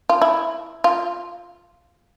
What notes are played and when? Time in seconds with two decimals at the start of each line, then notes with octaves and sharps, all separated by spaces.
0.09 F4
0.22 E4
0.84 F4